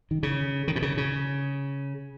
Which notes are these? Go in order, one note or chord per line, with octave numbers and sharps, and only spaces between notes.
D#3
C#3
D#3
B2
C#3
C#3